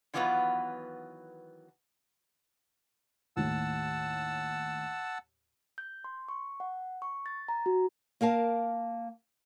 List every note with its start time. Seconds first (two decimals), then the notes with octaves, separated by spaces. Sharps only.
0.14 D#3 E3 F#3 B3 F4 B4
3.37 D#2 A2 D#3 F#5 A5 E6
5.78 G6
6.04 C6
6.29 C#6
6.60 F#5
7.02 C#6
7.26 A6
7.48 A#5
7.66 F#4
8.21 A#3 A#4 F5 A5